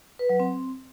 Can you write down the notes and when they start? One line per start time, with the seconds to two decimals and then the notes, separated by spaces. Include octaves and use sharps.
0.19 B4
0.29 F#3
0.40 C4